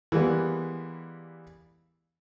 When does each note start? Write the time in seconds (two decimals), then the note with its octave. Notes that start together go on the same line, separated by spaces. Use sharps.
0.12 E3 G3 G#3 A#3 B3